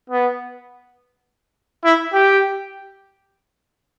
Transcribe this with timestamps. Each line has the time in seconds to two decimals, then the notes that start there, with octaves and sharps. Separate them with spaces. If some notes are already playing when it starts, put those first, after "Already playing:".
0.10 B3
1.84 E4
2.13 G4